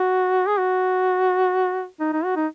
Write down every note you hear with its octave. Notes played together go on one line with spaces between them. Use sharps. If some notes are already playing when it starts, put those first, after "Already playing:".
Already playing: F#4
G#4
F#4
D#4
D#4
F#4
D#4